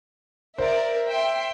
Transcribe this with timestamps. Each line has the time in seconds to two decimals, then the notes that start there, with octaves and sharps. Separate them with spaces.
0.58 A#4 C5 D5 E5
1.09 E5 G5 C6